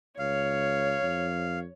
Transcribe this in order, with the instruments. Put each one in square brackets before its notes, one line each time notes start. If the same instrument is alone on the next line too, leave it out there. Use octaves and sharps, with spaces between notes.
[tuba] C#2 [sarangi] C#5 [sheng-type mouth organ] F5
[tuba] F2